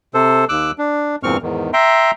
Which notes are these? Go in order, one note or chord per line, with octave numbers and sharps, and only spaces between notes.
C3 A4 C5
D#2 D6 E6 F#6
D4
E2 G2 A#2 C4 C#6 F6
E2 G#2 D#3
E5 G5 A#5 C6